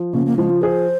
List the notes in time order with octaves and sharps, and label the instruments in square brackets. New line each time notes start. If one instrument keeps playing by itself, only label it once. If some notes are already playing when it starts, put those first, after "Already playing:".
Already playing: [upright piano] F3
[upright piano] C#3 [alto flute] A#3
[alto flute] A#3
[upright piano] F3 [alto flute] G#3
[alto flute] F4
[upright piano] G#4 [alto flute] C5